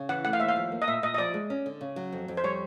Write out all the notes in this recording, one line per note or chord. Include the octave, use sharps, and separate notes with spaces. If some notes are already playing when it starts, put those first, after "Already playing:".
Already playing: C#3
E3 F#5
A3 F#5
F5
D#2 E5
F5
F3
A#3
D#5
A#2 E5
A#2 D#5
D#5
F3 D5
G#3
C#4
D3
C#3
F#3
F2
F2
C5
G3 C#5